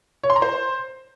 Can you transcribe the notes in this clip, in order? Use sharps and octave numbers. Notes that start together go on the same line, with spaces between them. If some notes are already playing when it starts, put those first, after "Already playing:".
C#5
C6
A#5
C5